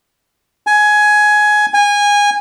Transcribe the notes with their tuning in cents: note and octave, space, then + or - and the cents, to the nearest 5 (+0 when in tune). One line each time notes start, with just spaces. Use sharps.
G#5 +15
G#5 -20